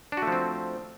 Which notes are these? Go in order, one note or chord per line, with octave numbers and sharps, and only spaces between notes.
F3 A3 C4 D4 F#4